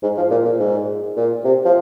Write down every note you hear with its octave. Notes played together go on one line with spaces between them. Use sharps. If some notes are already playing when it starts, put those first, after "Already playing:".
G#2
F3
A#2
A#2
G#2
A#2
C3
F3